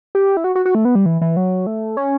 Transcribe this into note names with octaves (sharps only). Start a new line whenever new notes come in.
G4
E4
F#4
F#4
F#4
A3
B3
G3
E3
E3
F#3
A3
C#4